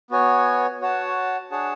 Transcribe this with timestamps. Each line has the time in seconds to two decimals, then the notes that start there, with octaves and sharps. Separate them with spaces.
0.10 B3 F#4 C#5 G#5
0.81 F#4 C#5 F#5 A5
1.51 D4 G#4 C#5 F#5 A5